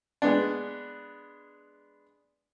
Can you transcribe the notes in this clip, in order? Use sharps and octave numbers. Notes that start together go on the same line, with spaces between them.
G#3 B3 D4